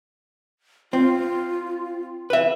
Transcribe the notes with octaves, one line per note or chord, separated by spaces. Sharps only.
C4 F4
B4 E5